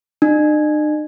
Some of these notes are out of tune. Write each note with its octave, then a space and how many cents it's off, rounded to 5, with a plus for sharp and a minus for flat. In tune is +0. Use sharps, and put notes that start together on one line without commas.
D#4 -45